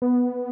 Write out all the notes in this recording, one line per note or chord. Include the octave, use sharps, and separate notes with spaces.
B3